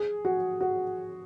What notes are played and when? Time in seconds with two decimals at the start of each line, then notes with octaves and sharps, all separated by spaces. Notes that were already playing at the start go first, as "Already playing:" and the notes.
Already playing: G#4
0.25 F#4
0.61 F#4